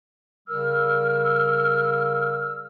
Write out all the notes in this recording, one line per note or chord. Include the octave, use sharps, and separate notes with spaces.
C#3 G3 A#4 E6 F6